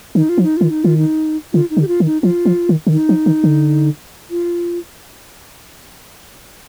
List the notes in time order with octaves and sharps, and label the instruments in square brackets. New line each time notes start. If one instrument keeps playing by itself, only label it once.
[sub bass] D#3 [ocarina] D#4
[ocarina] F4
[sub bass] F3
[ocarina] D#4
[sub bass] D#3 [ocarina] F4
[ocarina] D#4
[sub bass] D#3 [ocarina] F4
[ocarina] D#4
[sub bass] D3 [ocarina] F4
[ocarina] D#4
[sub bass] D3
[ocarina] G4
F4
[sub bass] D#3
[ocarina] D#4
[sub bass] F3 [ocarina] F4
[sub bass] F3
D#3
D3
[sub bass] D#3 [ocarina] D#4
[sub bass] F3
D#3
D3
[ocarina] F4